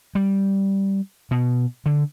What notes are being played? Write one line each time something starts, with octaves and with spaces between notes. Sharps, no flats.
G3
B2
D3